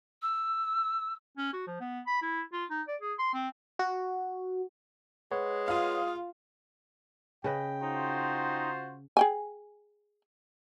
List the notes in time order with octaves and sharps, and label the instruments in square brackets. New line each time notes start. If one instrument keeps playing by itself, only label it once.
[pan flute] E6
[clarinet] C#4
F#4
F3
B3
B5
E4
F4
D#4
D5
G#4
C6
C4
[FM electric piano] F#4
[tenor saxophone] G#3 [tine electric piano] B4 C#5 F#5
[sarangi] F4 [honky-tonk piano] F5 D#6
[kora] C#3 B4 D#5 [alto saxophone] G5
[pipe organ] D#4 [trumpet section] F4 F#4 C5
[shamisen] G#4 G5 G#5